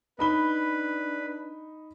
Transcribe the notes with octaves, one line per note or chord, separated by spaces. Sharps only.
D4 D#4 B4 B5 G7